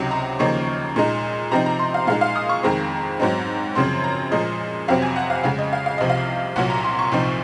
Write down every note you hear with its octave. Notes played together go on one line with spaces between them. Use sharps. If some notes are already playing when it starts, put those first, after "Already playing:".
Already playing: C#2 C3 F#3 C4 D#4
A#5
D#2 C#3 F3 A#3 D#4 C#6
A#2 G#3 D#4
C3 F3 C4 D#4 A#5
A#5
C6
F5
A#2 G#3 D#4 F5
F5
D#6
C#6
F2 D#3 G#3 C4 A#5
G#2 F#3 C4 D#4
F#2 C#3 F3 C4 C6
A#5
A#2 F3 G#3 D#5
F2 C3 F#3 C4 F5
G#5
F#5
F5
F2 C#3 G#3 F5
D#5
F5
F5
C2 C3 F3 D#5
F5
C2 A#2 F#3 F#5
A#5
C6
C#6
C2 A#2 F3 C4 D#4